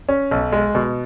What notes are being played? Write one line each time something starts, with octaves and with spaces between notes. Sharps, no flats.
C#4
B1
G#3
B2